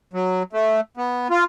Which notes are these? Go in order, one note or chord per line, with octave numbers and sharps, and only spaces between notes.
F#3
A3
B3
F4